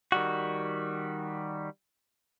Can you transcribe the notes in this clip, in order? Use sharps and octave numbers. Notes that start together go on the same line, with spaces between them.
D#3 G3 F#4